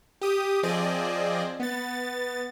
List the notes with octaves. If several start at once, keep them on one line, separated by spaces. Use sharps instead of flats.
G4 D#6
F3 C4 G#4 D5 D#5
B3 A6